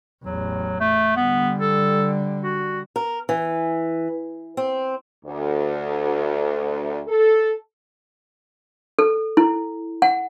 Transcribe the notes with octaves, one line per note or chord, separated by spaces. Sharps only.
A1 E2 F#3
A3
D3 G3 B3
A4
F#4
A#4
E3
C4
D2
A4
A4
E4
F#5